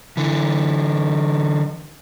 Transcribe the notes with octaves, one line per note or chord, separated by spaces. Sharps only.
D3 E3